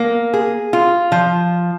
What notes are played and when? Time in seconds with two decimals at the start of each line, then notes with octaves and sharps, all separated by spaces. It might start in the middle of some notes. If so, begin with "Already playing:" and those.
Already playing: A#3
0.34 G#4
0.73 F4
1.12 F3